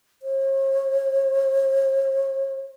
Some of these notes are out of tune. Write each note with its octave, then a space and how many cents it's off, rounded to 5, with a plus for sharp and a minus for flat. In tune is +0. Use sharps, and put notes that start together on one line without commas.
C#5 -45